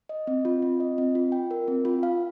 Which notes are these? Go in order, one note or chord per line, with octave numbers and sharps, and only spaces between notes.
D#5
C4
F4
C4
D#5
C4
F4
G5
A#4
C4
F4
F5